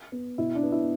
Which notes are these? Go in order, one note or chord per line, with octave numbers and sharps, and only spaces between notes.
B3
B2 E4
D4
B3
E4